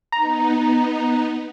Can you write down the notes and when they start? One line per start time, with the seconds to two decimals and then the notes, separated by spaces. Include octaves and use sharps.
0.12 B3 D#4 A#5